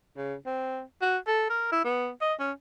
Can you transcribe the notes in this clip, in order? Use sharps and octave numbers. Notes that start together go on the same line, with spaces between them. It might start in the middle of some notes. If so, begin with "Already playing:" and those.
C#3
C4
F#4
A4
A#4
E4
B3
D#5
C#4